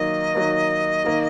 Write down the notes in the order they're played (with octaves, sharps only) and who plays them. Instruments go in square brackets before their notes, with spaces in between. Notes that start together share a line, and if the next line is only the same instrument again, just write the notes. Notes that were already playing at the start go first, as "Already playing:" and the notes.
Already playing: [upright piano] D#3 F#3 A#3 [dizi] D#5
[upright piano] D#3 F#3 A#3
D#3 A#3